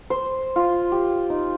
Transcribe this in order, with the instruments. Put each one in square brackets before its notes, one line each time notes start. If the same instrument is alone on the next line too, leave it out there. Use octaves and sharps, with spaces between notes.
[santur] C5
F4
G4
D#4